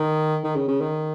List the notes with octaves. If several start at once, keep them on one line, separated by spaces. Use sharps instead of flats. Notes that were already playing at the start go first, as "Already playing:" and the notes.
Already playing: D#3
D#3
C#3
C#3
D#3